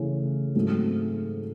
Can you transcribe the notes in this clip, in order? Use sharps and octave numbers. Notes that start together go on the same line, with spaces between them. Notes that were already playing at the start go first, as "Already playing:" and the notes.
Already playing: C#3 E3 A3 C#4 E4
G#2 F#3 A3 C4